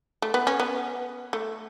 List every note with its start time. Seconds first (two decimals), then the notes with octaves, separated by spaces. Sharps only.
0.22 A3
0.34 B3
0.47 C#4
0.60 B3
1.33 A3